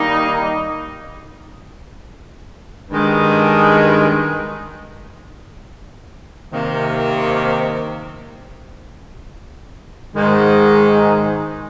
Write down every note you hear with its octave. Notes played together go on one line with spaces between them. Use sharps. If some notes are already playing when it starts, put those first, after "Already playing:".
Already playing: D#3 G3 A#3 D#4
G2 D#3 G#3
C3 D#3 A#3
G#2 D#3 G#3